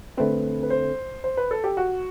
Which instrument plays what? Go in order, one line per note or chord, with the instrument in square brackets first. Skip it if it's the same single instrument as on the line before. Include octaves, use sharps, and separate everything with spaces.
[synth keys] D3 A3 C4 [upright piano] B4
[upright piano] B4
C5
C5
B4
A4
G4
F#4